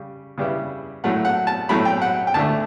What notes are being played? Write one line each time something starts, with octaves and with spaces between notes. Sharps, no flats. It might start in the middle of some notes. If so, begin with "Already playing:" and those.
Already playing: C#3 G3
C#3 G3 B3 E4
A2 F#3 A3 E4 F#5
F#5
A5
A2 F#3 A3 E4 B5
G5
F#5
G5
D2 D3 A3 A5